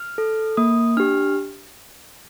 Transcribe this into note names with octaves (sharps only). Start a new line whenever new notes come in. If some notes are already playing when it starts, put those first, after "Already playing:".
Already playing: F6
A4
A#3 D#6
D4 G4 F6